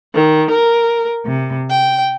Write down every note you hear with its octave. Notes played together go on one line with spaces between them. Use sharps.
D#3
A#4
C3
G5